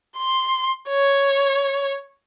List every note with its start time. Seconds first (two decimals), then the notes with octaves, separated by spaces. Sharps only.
0.17 C6
0.89 C#5